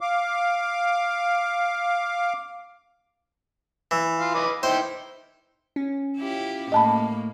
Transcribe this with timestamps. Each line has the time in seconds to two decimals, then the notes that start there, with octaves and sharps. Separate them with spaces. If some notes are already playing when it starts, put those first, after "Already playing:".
0.01 F5 D6
3.91 E3
4.20 F4 F5
4.34 B4 D#5 D6
4.63 D#4 E4 C5 G5
5.76 C#4
6.18 E4 F4 G4
6.72 A2 A#3 D#5 A5 B5